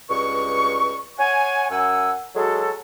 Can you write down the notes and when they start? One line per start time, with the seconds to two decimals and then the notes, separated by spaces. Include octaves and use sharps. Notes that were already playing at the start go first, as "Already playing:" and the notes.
0.09 C#2 G2 C#6
1.18 C#5 F#5 G#5
1.70 F#2 F#5 G#5 E6
2.36 F#3 G#3 F#4 A4